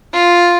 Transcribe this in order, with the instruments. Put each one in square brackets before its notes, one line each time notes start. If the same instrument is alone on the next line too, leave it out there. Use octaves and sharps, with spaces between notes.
[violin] F4